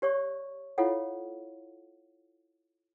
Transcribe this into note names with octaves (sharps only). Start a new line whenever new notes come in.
G4 C#5 D5 C#6
E4 F4 A4 C#5 F5 F#5